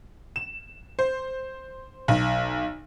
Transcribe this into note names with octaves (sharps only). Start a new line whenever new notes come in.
E7
C5
B1